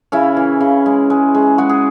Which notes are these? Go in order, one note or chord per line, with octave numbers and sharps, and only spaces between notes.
C#3 C#4 E4
E3
C#3
G#3
G#3
G#3
G#3 F#4
G#4